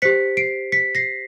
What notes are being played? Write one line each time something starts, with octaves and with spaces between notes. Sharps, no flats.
G4 C5 B6 C#7
C7 D7
B6 C#7
A#6 C7